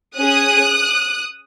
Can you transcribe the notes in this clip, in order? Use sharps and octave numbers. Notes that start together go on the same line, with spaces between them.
C#4 G#4 D#6 F#6